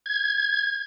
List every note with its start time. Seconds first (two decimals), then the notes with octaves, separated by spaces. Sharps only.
0.06 G#6